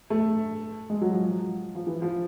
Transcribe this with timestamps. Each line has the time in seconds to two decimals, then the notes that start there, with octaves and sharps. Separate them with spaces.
0.10 A3
0.90 G#3
1.01 F#3
1.12 F3
1.75 F3
1.87 E3
2.02 F3